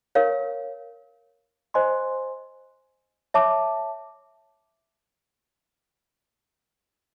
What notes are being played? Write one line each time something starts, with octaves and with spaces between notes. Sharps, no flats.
A#4 C#5 F5
C5 D#5 G#5 C6
C#5 E5 A5 D6